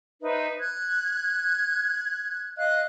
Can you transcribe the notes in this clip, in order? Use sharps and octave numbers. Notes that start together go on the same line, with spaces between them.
D#4 B4 C5 E5
F#6 G#6
D#5 F5 F#6